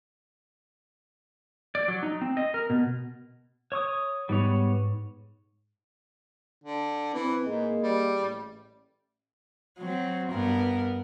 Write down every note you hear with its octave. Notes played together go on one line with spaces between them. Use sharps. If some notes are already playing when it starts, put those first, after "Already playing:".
D5
F#3
D#4
C4
D#5
A#4
B2
C#5 C#6 D#6
G#2 G3 B3 C#5
D3
E3 C4
G#2 A#3 G#4 D#5
G3
A1
F#3 C4
G2 B3 A#4